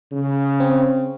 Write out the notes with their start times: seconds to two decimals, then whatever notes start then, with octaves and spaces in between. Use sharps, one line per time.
0.12 C#3
0.60 C4